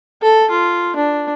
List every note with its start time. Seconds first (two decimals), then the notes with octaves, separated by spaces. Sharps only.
0.23 A4
0.51 F4
0.96 D4